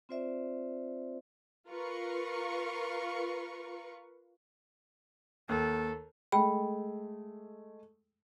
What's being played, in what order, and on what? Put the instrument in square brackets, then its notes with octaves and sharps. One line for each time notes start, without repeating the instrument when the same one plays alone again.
[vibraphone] C4 F4 C5 D5 E5
[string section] F4 A#4 B4 F5 C#6
[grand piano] D#2 [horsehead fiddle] A4
[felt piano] G#3 A3 [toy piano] G5 [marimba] B5